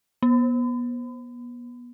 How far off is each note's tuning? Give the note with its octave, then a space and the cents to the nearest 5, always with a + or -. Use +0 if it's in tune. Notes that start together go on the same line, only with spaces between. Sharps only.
B3 -30